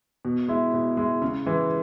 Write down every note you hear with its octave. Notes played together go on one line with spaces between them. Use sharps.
B2
G#3 E4
B2
G#3 E4
C#3
E3 G#3